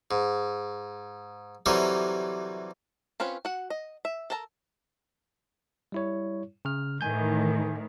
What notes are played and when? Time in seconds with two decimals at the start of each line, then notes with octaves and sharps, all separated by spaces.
0.11 G#2
1.66 C3 E3 F#3 G3 A4 A#4
3.20 C4 C#4 F4 B4 C#5
3.45 F#4 F#5
3.70 D#5
4.05 E5
4.30 A4 A#4 A5 A#5
5.92 G3 E4 C#5
6.65 C#3 F6
7.01 A2 D#3 E3 G#5 G6